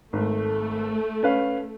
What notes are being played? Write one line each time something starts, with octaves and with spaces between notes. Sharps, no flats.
G#1 A3
C#4 B4 F5